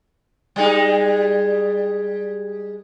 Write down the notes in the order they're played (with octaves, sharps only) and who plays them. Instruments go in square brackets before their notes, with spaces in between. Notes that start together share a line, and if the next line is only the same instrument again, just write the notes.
[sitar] G3 G#3 D#4